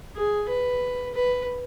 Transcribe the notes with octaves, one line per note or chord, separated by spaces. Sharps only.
G#4
B4
B4